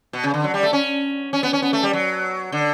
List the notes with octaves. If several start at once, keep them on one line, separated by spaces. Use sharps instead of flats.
B2
C#3
D3
F#3
G3
A3
C#4
C#4
B3
C#4
B3
A3
G3
F#3
D3